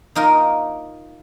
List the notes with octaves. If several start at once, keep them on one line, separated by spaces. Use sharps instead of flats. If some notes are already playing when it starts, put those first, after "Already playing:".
A#3 D#4 F4 A#4